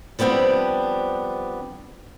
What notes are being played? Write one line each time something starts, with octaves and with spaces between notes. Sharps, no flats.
F3 G3 B3 C4 D4